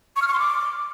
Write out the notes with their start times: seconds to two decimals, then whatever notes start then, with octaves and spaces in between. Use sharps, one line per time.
0.16 C#6
0.22 F6
0.28 C#6
0.33 C6
0.39 D6